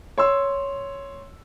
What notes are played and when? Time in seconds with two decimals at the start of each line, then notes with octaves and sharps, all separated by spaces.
0.18 C#5 C6 E6